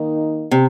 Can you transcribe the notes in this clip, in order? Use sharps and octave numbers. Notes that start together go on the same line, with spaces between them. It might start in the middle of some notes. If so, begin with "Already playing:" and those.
Already playing: D#3 A#3 D#4
C3